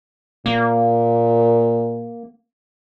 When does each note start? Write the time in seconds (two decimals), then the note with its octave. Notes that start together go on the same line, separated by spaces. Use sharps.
0.46 A#2 A#3